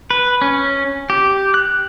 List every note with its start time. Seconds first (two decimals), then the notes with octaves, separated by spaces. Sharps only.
0.10 B4
0.42 C#4
1.10 G4
1.54 F#6